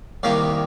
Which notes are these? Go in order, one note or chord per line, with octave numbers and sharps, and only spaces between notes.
C2 C3 D#3 G3 A#3 F5